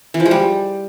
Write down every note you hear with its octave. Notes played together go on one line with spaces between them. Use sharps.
E3
F3
G#3
G3